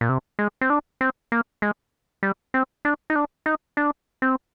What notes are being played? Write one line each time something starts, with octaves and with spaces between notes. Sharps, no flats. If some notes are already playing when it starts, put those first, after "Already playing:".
A#2
C3
G#3
C4
D4
C4
A#3
G#3
G3
C4
D4
D#4
D4
D#4
D4
C4